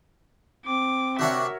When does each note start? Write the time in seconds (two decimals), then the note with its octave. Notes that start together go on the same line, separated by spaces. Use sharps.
0.66 C4 D6
1.19 C3 D4 F#4 A#4 C#5 E5 F#5